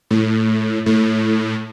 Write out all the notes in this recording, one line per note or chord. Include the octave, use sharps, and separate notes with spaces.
A2
A2